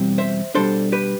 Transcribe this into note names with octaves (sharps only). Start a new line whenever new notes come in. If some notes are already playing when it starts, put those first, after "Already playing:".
Already playing: E2 B2 G3 C4
C5 E5
B2 G3 D4 A4 C5
G4 B4